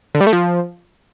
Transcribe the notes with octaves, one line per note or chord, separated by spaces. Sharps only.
D3
G3
A3
F3